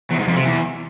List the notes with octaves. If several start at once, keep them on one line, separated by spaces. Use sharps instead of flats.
E2
G#2
F2
C3
E2